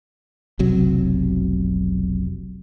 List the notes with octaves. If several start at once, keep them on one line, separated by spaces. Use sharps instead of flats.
F1 B1 C3 F#3